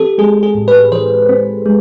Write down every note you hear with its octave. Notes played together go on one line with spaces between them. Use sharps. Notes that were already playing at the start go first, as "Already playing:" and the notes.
Already playing: E3 C4 G4 A4
G#3 G#4
G#4
A2
B4
E3 C5
C4
G#3